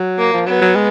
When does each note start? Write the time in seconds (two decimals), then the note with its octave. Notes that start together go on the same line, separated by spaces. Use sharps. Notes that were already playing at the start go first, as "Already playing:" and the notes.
Already playing: F#3
0.18 A#3
0.33 F3
0.47 F#3 B3
0.61 F#3
0.75 G#3